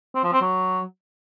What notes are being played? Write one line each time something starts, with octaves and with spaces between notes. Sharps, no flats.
C4
F3
C4
F#3